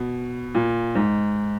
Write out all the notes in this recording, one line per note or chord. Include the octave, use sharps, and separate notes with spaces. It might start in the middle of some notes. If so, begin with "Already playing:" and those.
Already playing: B2
A#2
G#2